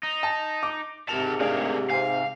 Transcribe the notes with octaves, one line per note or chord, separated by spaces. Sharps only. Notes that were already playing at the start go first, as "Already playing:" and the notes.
D#4
A5
D6
G#2 C3 A#4 A5 F7
A3 D4 G#4 A#4 F5
C5 F5 G#5